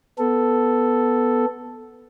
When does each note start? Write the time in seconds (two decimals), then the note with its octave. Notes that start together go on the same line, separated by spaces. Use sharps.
0.18 B3 A4